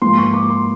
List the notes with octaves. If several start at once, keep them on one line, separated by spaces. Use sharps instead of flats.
G#2 F3 A#3 C6
C#6
D6
C6